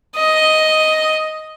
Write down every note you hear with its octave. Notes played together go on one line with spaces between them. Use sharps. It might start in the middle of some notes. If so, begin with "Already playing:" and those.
D#5